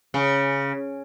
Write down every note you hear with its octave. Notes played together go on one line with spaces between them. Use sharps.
C#3